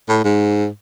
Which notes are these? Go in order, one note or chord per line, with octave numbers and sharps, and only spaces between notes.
A2
G#2